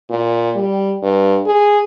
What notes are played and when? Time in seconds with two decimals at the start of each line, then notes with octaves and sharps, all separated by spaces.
0.10 A#2
0.56 G3
1.02 G2
1.46 G#4